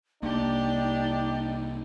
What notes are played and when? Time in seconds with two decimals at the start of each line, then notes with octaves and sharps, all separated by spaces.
0.23 C2 A#3 D4 D#4 G4 D5